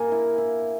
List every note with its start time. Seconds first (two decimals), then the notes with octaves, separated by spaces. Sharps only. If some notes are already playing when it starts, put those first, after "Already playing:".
Already playing: A#3 G#5
0.12 E4
0.38 E4